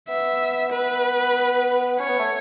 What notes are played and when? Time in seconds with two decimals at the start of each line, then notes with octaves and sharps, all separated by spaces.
0.08 B3 E5
0.72 B4
1.99 C#4 C#5
2.09 B3
2.19 A3